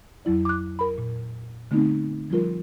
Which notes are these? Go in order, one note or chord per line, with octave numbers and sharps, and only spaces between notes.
F2 F#3 E4 D5
D6 F#6
A#4 B5
A#2
D3 A3 B3 C4 D#4
F3 G3 F4 A#4